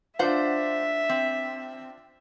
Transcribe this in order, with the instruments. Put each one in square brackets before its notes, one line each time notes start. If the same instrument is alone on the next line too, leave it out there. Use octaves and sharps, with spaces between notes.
[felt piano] D4 F4 [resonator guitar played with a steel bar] C5 F#5 [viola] E5
[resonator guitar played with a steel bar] C4